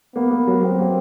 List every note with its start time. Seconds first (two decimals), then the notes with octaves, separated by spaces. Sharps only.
0.15 A#3 B3
0.31 A#3
0.47 F#3
0.63 F#3 C4
0.79 A#3